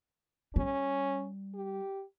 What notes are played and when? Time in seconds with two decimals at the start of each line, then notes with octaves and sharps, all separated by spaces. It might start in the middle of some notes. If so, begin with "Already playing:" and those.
0.56 G3 C#4
1.55 G4